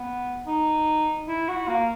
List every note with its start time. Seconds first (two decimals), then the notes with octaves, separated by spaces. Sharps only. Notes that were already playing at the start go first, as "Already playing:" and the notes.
Already playing: B3
0.47 D#4
1.27 E4
1.48 F#4
1.68 A#3